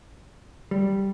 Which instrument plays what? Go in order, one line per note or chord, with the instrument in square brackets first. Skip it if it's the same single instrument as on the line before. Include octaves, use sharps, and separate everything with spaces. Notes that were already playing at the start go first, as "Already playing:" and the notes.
[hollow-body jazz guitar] G3